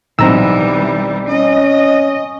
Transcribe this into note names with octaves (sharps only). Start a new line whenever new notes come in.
B1 E3 G3 C4 A#5 E6
C#4 D#5